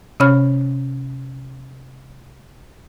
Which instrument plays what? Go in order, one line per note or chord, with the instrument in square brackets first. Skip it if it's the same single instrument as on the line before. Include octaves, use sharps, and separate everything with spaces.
[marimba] C3 C#4 C#5 B5 F6